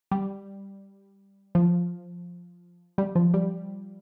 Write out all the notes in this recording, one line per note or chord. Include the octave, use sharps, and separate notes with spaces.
G3
F3
G3
F3
G3